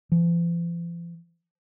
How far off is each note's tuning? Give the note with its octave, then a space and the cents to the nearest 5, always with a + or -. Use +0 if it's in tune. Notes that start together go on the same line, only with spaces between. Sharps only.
F3 -45